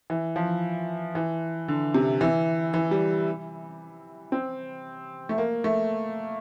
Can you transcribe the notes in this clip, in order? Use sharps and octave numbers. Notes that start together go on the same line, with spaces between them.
E3
F3
E3
D3
C3
E3
E3
G3
C4
A3
A#3
A3